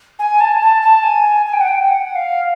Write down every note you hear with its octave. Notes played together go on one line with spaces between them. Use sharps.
G#5
A5
A5
A5
G#5
G#5
G5
F#5
G5
F#5
F5